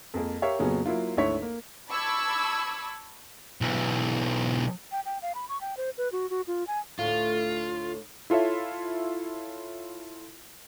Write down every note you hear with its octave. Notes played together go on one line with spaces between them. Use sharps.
F2 G#3 A#3 G#4 A#4
G4 A#4 C#5 E5 F5
F2 A#2 C#3 F#3 B3 C#4
F#3 A#3 E4 F4
G#1 D2 E4 C#5 B6
A#3
A5 B5 C#6 D6 E6 G#6
B1 E3
G5
G5
F5
B5
C#6
G5
C5
B4
F#4
F#4
F4
G#5
D2 A2 F4
E4 F4 A4 C#5 E5